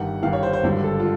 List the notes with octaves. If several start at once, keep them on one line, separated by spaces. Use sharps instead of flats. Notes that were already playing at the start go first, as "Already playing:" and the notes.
Already playing: G1 G2 D#3 F#5
G1 G2 D#3 F5
C#5
C5
C5
G#1 G2 D3
A4
F4